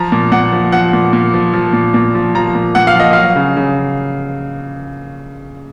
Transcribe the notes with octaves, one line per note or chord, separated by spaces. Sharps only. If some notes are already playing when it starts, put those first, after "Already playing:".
Already playing: F3 A#5
A#2
A#2 F#5
F3
F3 F#5
A#2
A#2
F3
F3
A#2
A#2
F3
F3 A#5
A#2
A#2 F#5
F5
F3 D#5
F#3 F5
C#3
C#3